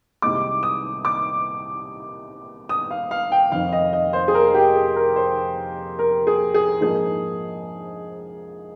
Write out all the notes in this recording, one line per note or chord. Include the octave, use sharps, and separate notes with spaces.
C2 C3 D#3 G#3 D#4 D6
D#6
D6
D#6
F5
F5
G5
F1 F2 D#3 F5
D#5
D#5
C5
G#4
A#4
G4
G#4
A#4
C5
A#4
G#4
G#4
A#1 G#2 F3 A#3 D#4 G#4